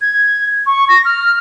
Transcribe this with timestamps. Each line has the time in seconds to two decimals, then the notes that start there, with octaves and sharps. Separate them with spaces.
0.01 G#6
0.66 C#6
0.88 A#6
1.05 F6